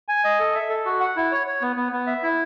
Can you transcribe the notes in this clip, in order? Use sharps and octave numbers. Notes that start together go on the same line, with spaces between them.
G#5
D#5
A4
E5
A4
F#4
F#5
E4
C#5
C#5
B3
B3
B3
E5
E4